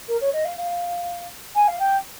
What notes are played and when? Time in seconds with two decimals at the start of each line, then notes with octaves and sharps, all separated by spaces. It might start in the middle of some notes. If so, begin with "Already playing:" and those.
0.08 A#4
0.21 C#5
0.33 D#5
0.44 F5
0.57 F5
1.55 G#5
1.67 F5
1.79 G5